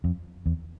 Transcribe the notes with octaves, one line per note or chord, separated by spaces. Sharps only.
F2
E2